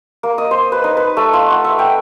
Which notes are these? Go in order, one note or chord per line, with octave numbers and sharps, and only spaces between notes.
A#3
D#5
C5
B4
D#4
B4
A3
F4
F#5
E5
G5